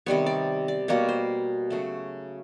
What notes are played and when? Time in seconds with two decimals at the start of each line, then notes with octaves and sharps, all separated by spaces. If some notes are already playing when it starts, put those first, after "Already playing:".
0.06 C3 D#3 G3 B3 C#5
0.26 D5
0.68 D5
0.88 B2 G3 A#3 C#5
1.09 C5
1.70 C#3 F#3 A3